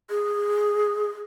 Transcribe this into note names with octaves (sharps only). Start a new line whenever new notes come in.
G#4